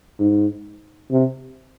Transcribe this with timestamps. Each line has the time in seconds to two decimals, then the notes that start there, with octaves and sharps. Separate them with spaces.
0.20 G#2
1.11 C3